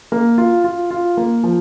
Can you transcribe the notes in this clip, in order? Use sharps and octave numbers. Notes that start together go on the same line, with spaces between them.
A#3
F4
F4
F4
A#3
F3